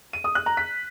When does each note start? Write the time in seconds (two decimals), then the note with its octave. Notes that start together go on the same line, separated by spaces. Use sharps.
0.13 D#7
0.24 D#6
0.35 F#6
0.46 A#5
0.57 B6